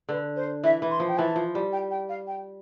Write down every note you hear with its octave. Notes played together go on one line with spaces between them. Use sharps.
D3 B4
C5
E3 E5
E3
C6
F3
G5
E3 A5
F3
G3
G5
G5
F5
G5